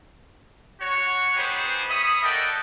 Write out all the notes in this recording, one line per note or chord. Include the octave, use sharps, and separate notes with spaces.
F#4 C#5
B3 D#4 G4 G#4 B4 C5
C#5 E5 B5 D#6
F#4 A4 A#4 D5 D#5 G5